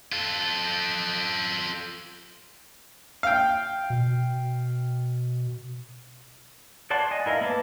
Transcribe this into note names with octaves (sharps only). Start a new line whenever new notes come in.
F4 A4
F5 G5
B2
C#5 D5 F#5 A5 C6
D#5 G#5
E4 A#4 D#5 F5
A#3 B4 C#5 A5 D6